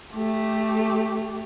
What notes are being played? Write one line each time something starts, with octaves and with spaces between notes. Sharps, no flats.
A3 G4